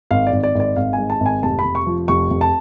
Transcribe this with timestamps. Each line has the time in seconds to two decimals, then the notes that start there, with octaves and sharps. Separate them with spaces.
0.11 G#1 F5
0.27 D5
0.33 G#1
0.43 D5
0.55 G#1
0.60 D5
0.76 G#1 F5
0.93 G#5
0.98 G#2
1.10 A5
1.20 G#1
1.26 G#5
1.43 F1 A5
1.59 B5
1.65 F1
1.75 C#6
1.87 F3
2.08 F1 C#6
2.30 F1
2.41 A5